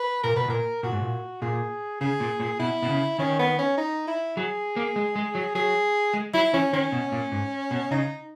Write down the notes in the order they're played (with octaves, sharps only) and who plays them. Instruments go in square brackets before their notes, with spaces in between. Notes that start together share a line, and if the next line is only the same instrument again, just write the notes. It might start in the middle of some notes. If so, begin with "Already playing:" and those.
Already playing: [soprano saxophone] B4
[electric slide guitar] A#2 [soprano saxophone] A#4
[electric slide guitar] B2 [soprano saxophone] B4
[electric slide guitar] A#2 [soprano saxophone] A#4
[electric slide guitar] A#2 [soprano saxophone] F#4
[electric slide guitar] G#2
A#2
[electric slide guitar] A#2 [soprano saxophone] G#4
[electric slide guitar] C#3 [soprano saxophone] G#4
[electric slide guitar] A#2
A#2
[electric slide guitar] B2 [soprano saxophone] E4
[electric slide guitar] B2
C#3
[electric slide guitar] D#3 [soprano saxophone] C#4
[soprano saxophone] B3
C#4
D#4
E4
[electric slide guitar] F#3 [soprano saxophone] G#4
[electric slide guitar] A#3
G#3
G#3
F#3
[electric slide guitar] F#3 [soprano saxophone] G#4
[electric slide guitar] G#3
[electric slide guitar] F#3 [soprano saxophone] E4
[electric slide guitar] E3 [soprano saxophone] C#4
[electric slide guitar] D#3 [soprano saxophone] C#4
[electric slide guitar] B2
A#2
G#2
B2
[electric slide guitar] C#3 [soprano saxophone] D#4